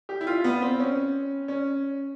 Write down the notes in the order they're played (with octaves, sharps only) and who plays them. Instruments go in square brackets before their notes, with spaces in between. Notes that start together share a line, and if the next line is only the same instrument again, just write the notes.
[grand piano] G4
E4
F4
B3
C4
C#4
C#4